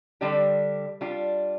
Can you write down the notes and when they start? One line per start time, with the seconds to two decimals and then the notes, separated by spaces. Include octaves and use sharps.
0.21 D3 G3 D4 G4 D5
1.01 G3 D4 F4